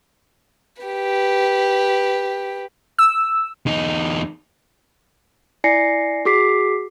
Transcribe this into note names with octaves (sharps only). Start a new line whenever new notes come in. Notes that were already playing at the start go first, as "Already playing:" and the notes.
G4 B4
E6
E2 D#4
E4 D5 G#5 A#6 C7 C#7
F#4 G#4 D6 B6 C7